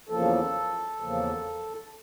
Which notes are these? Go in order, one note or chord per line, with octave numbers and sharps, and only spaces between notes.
E2 C#3 F3 A#3 A4
E2 C#3 F3 A#3